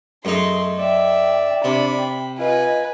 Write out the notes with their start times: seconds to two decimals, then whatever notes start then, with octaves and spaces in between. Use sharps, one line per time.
0.25 F#2 A3 D#4 G#4 C6
0.79 D5 E5 G5
1.64 C3 D4 B5
1.96 G5
2.39 F4 B4 D#5 G#5